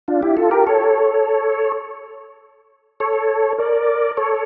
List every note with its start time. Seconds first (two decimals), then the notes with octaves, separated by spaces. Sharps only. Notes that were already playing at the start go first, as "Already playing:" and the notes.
0.08 D4 F4
0.22 E4 G4
0.37 F4 A4
0.51 G4 A#4
0.67 A4 C#5
3.00 A4 C#5
3.58 A#4 D5
4.17 A4 C#5